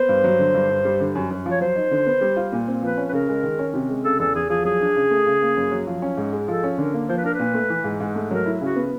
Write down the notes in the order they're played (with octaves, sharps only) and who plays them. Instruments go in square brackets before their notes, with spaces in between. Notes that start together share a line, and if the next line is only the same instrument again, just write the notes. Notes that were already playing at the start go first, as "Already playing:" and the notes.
Already playing: [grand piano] B3 [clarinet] C5
[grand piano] G2
F#3
D3
G2
G2
G3
D3
F#2
F#2
F3
[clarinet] C#5
[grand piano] F#3 [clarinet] C5
[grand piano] D#4
D3
B3
G3
F4
A#2
C4
[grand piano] F3 [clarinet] B4
[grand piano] C#4
[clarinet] B4
[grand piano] C#3 [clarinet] A#4
[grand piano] G#3
D#3
C#4
C3
G#3
[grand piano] C#3 [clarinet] A4
[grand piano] E2 [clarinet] A4
[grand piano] E2 [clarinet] G#4
[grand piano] F3 [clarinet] G#4
[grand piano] F#3 [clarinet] G#4
[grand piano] D4
C#3
A3
C#3
A#3
F#2
F#3
F3
C#4
G#2
G#3
[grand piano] F3 [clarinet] A4
[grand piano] C#4
[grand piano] D3 [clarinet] A#4
[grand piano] A#3
[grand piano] F3 [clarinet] C5
[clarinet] B4
[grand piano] D4 [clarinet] A#4
[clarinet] B4
[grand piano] A#2
A3
E3
G#2
G#2
A3
[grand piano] F#3 [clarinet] A#4
[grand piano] E4
[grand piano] C#3 [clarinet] F#4
[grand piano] B3